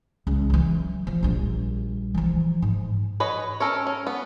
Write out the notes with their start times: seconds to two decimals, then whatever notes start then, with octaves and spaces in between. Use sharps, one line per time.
0.27 C#2
0.50 E3 F#3
1.07 E3 F3
1.23 A#1 G3
2.15 E3 F3
2.62 G#2
3.20 B4 C#5 D#5
3.60 C#4 A4 A#4 C#5
3.87 C#4
4.07 B3